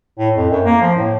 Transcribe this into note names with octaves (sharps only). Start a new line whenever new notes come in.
A2
F2
F#2
A#3
F3
A2